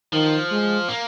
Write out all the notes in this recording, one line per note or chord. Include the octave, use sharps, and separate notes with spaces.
D#3 F3
G#3
A#3